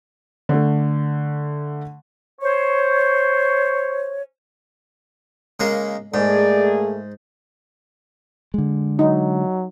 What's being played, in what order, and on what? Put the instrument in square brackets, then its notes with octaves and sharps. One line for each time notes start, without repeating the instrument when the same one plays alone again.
[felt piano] D3 A3
[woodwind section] C5 C#5
[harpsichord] C#3 G#3 A#3
[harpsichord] G#2 [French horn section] A3 A#3 G#4 [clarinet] D5
[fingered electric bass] D3 G#3
[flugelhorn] F#3 [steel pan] D#4